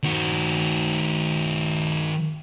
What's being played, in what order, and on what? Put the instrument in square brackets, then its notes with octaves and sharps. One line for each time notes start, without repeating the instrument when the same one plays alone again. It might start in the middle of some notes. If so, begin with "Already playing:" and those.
[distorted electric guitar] D#3 F#4